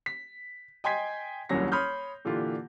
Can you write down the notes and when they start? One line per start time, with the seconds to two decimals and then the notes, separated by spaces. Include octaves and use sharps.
0.06 B6
0.84 D#5 G5 G#5 C6 G#6 B6
1.49 D#1 C2 A#2 F#3 C#4 A#6
1.72 C#5 B5 C6 D#6 F6 G6
2.25 A#2 D3 E3 F4 G4